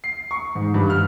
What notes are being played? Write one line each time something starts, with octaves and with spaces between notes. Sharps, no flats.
C7
C#6
G#2
G2
F6